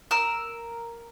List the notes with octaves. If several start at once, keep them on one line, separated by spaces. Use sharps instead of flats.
A#4 E6